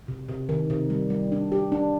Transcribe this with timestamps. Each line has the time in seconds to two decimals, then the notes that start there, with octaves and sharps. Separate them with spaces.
0.08 C3
0.28 C3
0.49 D#3
0.70 C3
0.90 G3
1.10 G3
1.32 D4
1.52 G4
1.72 D4